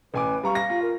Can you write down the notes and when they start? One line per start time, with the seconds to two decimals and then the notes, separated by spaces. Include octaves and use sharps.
0.14 A1 B4 G#5 D6
0.44 G3 F5 A#5 C#6
0.55 A#6
0.70 F4
0.82 A#4